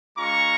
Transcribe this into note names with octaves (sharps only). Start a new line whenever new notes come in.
G#3 C#4 F4 A#5 C#6